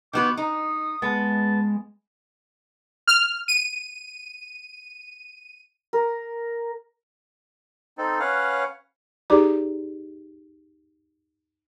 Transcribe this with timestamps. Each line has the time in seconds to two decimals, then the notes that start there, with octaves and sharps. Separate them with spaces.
0.13 D#3 B3 F#4 D6
0.37 D#4 D#6
1.02 G#3 B3 A5
3.08 F6
3.48 D#7
5.93 A#4
7.98 C4 D#4 A4
8.20 C#4 B4 C#5 F5 F#5
9.30 D#4 G4 G#4 D5 A#5 D6